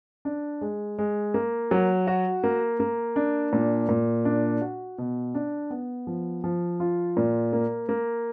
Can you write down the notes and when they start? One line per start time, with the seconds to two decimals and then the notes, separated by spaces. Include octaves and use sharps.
0.25 D4
0.61 G#3
0.99 G#3
1.34 A#3
1.71 F#3
2.07 F#4
2.44 A#3
2.80 A#3
3.16 D4
3.53 A#2
3.89 A#2
4.25 D4
4.61 F#4
4.98 B2
5.34 D4
5.70 B3
6.07 F3
6.44 F3
6.80 F4
7.17 A#2
7.53 A#3
7.89 A#3